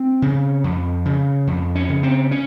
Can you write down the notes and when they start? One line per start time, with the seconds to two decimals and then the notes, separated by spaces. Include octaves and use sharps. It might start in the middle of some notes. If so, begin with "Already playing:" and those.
Already playing: C4
0.22 C#3
0.64 F2
1.05 C#3
1.47 F2
1.75 C#4
1.89 C#3
2.03 C4
2.31 C#4